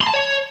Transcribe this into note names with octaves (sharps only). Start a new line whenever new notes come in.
C6
A5
C#5